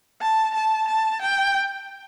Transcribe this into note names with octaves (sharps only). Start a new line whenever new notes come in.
A5
A5
A5
G5